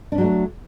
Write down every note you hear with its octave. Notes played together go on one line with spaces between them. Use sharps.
F#3 G3 A3 C#4 D4